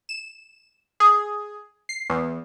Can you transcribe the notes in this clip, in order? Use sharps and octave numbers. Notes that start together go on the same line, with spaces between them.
E7
G#4
C7
E2